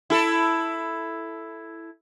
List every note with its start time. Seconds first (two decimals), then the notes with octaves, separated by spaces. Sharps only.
0.10 E4 A4